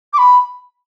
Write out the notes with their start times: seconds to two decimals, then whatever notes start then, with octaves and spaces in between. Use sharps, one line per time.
0.13 D6
0.18 B5